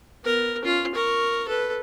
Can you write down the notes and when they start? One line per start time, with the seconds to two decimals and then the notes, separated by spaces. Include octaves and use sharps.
0.24 B3 A#4
0.63 C#4 F4
0.95 A#4 C#6
1.48 A4 B4